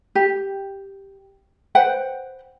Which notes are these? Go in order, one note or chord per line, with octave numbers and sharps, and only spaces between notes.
G4
B4 C5 F#5 G5